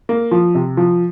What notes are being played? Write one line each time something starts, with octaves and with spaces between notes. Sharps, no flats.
A#3
F3
C3
F3